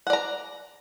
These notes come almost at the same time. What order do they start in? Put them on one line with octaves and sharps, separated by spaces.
F#5 D5 A#5